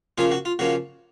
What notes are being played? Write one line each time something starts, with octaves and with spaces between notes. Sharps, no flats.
C#3 F3 A#3 C#4 F4 G#4
F#4
F4
C#3 F3 A#3 C#4 F#4